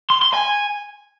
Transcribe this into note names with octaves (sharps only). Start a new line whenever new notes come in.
C6
C6
G#5